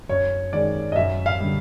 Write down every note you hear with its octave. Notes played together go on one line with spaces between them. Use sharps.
F#2 C#5
D#3 G#3 D5
D#5
F#2 E5
F5
D3 G3